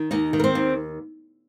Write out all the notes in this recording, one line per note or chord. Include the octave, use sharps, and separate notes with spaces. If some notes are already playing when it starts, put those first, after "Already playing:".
Already playing: D#3
D#2 D#4 D#5
D#3
A#4
C4 C5
D#2